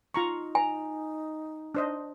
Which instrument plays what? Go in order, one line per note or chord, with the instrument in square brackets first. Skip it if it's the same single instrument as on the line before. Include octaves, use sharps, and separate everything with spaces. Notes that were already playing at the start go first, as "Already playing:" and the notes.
[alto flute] D#4 [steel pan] F4 A#5 C#6
[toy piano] G#5 [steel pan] A#5
[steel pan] D4 C5 D#5